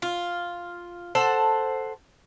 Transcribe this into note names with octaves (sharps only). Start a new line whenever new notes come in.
F4
A4 C5 F#5